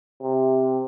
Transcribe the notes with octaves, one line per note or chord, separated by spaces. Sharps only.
C3